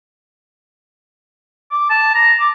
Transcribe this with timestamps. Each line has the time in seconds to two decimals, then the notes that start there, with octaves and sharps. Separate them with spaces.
1.71 D6
1.90 A5
2.15 A#5
2.40 D6